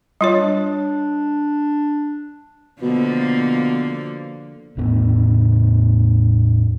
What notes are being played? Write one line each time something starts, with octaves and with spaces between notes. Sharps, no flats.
G3 F4 C#5
D4
B2 D3 F3 A#3
E2 A2 B3 D4